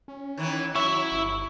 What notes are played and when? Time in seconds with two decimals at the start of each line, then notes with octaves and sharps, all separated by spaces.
0.08 C#4
0.37 D#3 E3 B3
0.76 F#3 E4 E5 C#6
1.12 G1